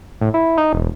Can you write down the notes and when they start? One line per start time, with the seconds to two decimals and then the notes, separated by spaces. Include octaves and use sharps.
0.21 A2
0.34 E4
0.58 D#4
0.73 E1